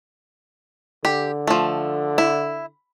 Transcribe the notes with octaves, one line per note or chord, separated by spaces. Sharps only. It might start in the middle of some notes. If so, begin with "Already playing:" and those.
D3 G4
F3 A3
E4